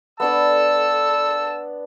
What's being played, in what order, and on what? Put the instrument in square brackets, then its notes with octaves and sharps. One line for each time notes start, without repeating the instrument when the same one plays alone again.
[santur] B3 D4 D5 [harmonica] A5 E6